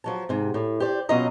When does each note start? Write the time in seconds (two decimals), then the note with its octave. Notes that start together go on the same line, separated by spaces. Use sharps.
0.04 F3 F#3 A5
0.29 G#2 C3
0.54 A2
0.80 G4 C5 D5
1.09 B2 F#3 C#4 F4 D#5 A#5